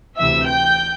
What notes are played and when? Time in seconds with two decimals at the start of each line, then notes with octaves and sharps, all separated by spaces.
0.18 D2 C3 E3 E5 E6
0.47 G5 G6